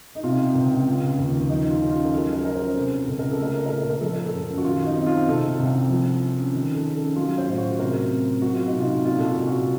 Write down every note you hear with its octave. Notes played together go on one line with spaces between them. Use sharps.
D#4
C3 F4
C#2
C#3
D#2
F3 D#4
F4
C#4
F4
A#4
F#3 A4
A#4
C#4 A#4
C5
C3 A4
C#2 A4
A#4
A4
A3 A#4
A4
A#2 A#4
A4
A#4
F3 A4
A#4
A4
F#2
F#4
D#3 F4
D#4
C4
F4
C3 A4
C2
F3
C#4
D#3
A4
C#4
A4
F#3 F4
C5
A2 F4
F#4
C3 A#4
C4
F#3 F#4
F4
D#4
C3
F4
A#2 F4
A4
F#4
C2
F#4